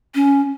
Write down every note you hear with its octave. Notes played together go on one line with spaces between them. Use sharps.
C#4